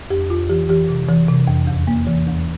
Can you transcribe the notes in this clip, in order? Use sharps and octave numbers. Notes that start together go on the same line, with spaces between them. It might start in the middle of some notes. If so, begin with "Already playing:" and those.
F2 G4
F2 F4
E3 G4
E3 G4
C3
E3
C3
F2
E2
A#3
E3
E2